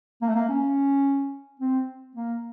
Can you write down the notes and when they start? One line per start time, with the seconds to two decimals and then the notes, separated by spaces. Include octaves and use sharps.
0.22 A#3
0.29 A3
0.35 A#3
0.49 C#4
1.60 C4
2.16 A#3